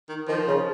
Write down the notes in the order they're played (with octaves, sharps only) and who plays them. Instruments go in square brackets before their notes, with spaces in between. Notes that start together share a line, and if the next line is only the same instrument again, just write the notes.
[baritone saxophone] D#3
[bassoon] D#3 [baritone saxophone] F3
[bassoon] C#3